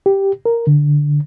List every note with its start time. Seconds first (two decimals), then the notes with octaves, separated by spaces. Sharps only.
0.06 G4
0.45 A#4
0.67 D3